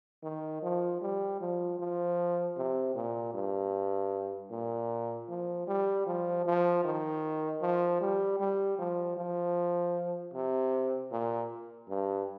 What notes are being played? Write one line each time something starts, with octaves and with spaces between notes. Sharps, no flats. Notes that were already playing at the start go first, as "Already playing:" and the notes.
D#3
F3
G3
F3
F3
C3
A#2
G2
A#2
F3
G3
F3
F3
D#3
F3
G3
G3
F3
F3
C3
A#2
G2